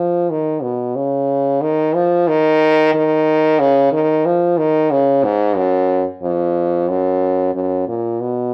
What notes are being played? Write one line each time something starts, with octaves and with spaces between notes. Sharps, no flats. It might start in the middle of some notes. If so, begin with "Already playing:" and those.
Already playing: F3
D#3
B2
C#3
D#3
F3
D#3
D#3
C#3
D#3
F3
D#3
C#3
G#2
F#2
F2
F#2
F#2
A#2
B2